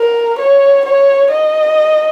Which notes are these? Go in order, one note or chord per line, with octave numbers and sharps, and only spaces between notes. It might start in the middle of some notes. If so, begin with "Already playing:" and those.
Already playing: A#4
C#5
C#5
D#5